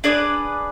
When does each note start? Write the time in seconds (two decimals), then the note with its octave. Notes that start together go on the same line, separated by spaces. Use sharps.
0.04 D4 G#4 B4 D5